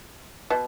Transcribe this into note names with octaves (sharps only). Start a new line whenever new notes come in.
B2